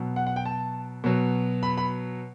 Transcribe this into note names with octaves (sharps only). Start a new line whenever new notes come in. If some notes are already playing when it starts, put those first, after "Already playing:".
Already playing: B2 F#3
F#5
F#5
G5
A5
B2 F#3
B5
B5